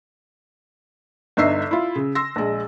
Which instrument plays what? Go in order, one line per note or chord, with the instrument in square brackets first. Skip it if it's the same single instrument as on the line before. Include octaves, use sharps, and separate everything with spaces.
[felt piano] G1 G2 D#4 E5 E6 C7
E4 F4
C#3
C6 E6 A#6
A#1 G#3